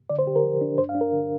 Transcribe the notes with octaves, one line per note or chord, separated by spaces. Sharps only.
D3 D5
C5
D3 G4
A#4
F3
D4
G2 C5
F5
D4
A#4
D3